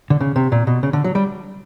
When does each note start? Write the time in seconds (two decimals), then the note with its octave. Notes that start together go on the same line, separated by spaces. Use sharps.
0.10 D3
0.20 C#3
0.36 C3
0.52 A#2
0.67 B2
0.83 C#3
0.93 D3
1.04 F#3
1.15 G3